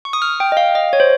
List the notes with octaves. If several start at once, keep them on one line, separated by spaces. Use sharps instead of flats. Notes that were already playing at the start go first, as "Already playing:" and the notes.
C#6
D#6
F6
G5
D#5
F5
D#5
C#5
C5